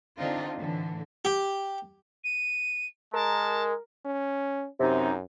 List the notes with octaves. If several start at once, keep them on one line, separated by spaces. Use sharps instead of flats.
D3 C4 D4 D#4 F4
A2 D3 E3
G4
D#7
G#3 A#4 A5
C#4
F#2 C3 D#4